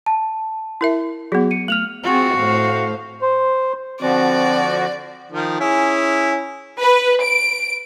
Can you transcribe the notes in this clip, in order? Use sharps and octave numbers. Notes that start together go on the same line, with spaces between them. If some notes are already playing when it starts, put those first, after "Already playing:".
A5
E4 A#4 E5
F#3 B3 F#4 G#4
C#7 D#7
A3 F6 F7 F#7
C4 F4 F#4 G#4
A2 C5 F5
C5
D3 F3 C4 F#4 D5
D#3 F3
C#4 E4 G#4
B4
D7